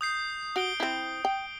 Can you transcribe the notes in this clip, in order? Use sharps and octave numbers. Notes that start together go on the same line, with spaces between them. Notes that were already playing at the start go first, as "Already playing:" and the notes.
D#6 G6 C7
F#4 D#6 D7 G7
C4 E4
G5